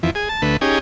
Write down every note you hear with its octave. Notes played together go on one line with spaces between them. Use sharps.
F2 E3
G#4
A5
D2 A3 B4
C#4 D#4 G4 G#4